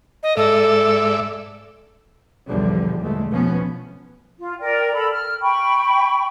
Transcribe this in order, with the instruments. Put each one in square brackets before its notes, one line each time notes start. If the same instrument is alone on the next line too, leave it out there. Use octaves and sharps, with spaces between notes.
[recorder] D#5
[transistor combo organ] G#2 D5 E5 [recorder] A4
[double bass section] B1 E2 D3 F3 G3
A#1 E2 D3 G#3 A3
B1 F3 B3 C#4
[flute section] F4
A#4 D5 G5
A4 B5
F6
G5 B5 C#6